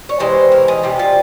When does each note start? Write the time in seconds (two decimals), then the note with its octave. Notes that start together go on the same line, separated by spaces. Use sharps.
0.09 C#5
0.20 C3 E3 G#3 C5
0.52 A#4
0.68 G#4
0.83 C3 G3 G4
0.99 F4